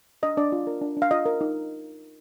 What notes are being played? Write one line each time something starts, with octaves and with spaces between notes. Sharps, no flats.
D4 D#5
D4 D5
F4
A#4
D4
D4
F5
F4 D#5
A#4
D#4